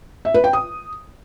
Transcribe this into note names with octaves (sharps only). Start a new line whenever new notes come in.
E5
B4
G5
D#6